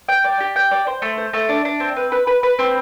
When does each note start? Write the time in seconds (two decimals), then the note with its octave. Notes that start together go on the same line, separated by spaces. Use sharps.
0.09 G5
0.24 D5
0.40 G4
0.56 G5
0.71 D5
0.87 C5
1.02 A3
1.17 C5
1.33 A3
1.49 D4
1.65 D4
1.80 C4
1.96 B4
2.12 B4
2.27 B4
2.43 B4
2.59 C4